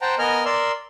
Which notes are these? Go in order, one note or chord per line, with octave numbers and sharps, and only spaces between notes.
C5 F#5 G5 A5 A#5
B3 A#4 D#5 G#5 F6
A#4 D5 C6 E6